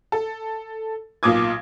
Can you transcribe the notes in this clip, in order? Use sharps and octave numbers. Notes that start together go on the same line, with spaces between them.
A4
B1 A#2 F4 D6 D#6 G#6